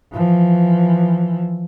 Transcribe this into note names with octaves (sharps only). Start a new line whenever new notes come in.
E3 F3